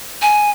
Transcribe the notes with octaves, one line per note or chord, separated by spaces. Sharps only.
G#5